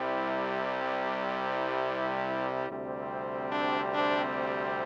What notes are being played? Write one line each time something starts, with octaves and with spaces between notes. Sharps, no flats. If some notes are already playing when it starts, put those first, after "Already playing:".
Already playing: C2 C3 G3 E4
G4
E4
D2 C3 G3 C4
D4
D4